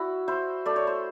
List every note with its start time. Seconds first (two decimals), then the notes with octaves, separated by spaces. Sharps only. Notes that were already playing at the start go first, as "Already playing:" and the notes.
Already playing: E4 F#4
0.28 E4 C5
0.66 A3 D5
0.76 C#5
0.87 C5